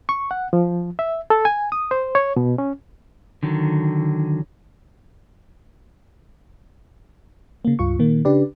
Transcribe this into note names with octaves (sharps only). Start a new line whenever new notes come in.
C#6
F#5
F3
E5
A4
G#5
D#6
C5
C#5
B2
C#4
D3 D#3 F#3
C#3 A#3
C#2 G2 F4 C#6
A#2 D#3 A#3
C#3 D4 G4 B4 D5